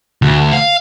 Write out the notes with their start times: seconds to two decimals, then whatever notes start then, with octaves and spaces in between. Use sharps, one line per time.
0.22 D2
0.53 F5